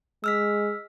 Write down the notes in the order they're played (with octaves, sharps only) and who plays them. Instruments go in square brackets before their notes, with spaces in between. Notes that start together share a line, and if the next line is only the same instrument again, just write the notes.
[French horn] G#3 [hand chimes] E6 F6 B6